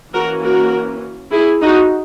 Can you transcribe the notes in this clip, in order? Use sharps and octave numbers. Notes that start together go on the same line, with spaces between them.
E3 A#3 C#4 F#4 A#4
F#4 A#4
E4 G#4
D#4 F#4